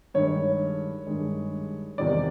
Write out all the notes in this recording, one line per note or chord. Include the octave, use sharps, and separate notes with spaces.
G2 D#3 G#3 C#5
G2 D#3 G#3
E2 C3 D#3 G3 D5